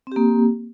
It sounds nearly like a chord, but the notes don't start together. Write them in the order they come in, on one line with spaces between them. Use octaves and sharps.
C4 G4 A#3